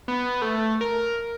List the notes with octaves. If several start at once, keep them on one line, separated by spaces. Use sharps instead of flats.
B3
A3
A#4